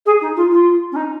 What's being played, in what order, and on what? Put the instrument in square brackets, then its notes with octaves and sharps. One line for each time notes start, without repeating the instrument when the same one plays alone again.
[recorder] G#4
D#4
F4
F4
C#4
D#4